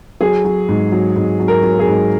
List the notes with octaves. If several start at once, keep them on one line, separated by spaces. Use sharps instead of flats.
F#3 G#4
F#3
G#2
F#3
G#2
F#3
A#4
F#3
G#4
G#2